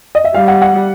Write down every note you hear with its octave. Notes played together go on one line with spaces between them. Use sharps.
D#5
E5
G3 F5
F#5
F#5